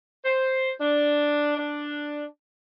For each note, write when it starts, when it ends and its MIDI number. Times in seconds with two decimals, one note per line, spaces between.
0.25 0.72 72
0.80 1.55 62
1.57 2.24 62